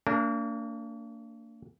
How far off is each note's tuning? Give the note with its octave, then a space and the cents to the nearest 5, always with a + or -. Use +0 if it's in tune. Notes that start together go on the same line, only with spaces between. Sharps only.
A#3 -35 D4 -25 A#4 +0